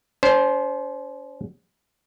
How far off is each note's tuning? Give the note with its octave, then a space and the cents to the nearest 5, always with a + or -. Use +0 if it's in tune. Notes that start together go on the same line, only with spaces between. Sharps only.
C#4 +45 C5 +0